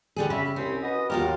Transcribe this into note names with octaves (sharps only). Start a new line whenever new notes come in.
D3 G3 G#4
C#3 E5 B5
C2 C4 C#4
F#4 B4 D#5
D#2 F#3 F4 G4 A#4